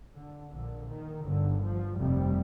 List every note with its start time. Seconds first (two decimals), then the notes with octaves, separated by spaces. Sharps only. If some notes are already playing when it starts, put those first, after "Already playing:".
0.16 D3
0.53 A#1 A#2 D3
0.89 D#3
1.26 G1 G2 D3
1.63 F3
1.99 F1 F2 C3 G3